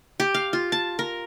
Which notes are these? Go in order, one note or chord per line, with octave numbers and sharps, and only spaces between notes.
G4
F5
F4
A5
A#4